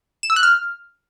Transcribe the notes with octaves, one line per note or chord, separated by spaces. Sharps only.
E7
E6
F#6
F6